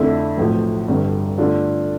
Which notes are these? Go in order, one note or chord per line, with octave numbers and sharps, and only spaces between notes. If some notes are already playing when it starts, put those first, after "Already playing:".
Already playing: F2 D3 A3 E4
B1 A2 F3
G1 G2 D3 G3
G2 D3 A3 D4 F4